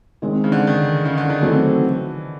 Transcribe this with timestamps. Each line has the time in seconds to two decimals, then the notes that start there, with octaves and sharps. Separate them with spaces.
0.22 D#3 G#3 C4
0.44 C#3
0.52 D3
0.67 D#3
1.05 C#3
1.18 D3
1.30 D#3
1.42 D#3 E3 F#3 A3 C4